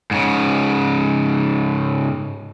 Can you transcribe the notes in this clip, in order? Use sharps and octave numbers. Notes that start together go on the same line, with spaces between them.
G#2 C#3